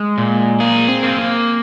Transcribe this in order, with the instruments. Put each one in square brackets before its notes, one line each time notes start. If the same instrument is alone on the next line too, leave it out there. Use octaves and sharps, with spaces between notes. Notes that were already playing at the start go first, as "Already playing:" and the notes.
Already playing: [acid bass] G#3
[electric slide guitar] A#2
[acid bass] A#3 [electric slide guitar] G#4
[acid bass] C4
[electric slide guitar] A#3